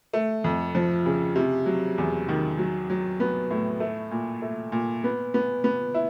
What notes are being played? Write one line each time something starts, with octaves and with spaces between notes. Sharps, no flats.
A3
F2
F3
C#3
C3
F#3
E2
D#3
F#3
F#3
B3
A2
A3
A#2
A3
A#2
B3
B3
B3
E4